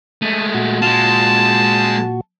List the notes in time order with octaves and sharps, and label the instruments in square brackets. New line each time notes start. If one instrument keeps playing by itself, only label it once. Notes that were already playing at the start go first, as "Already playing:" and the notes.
[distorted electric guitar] G#3 A3 [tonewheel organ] D#6
[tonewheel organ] A#2 F#4
[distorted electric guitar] G#3 F4 [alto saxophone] A5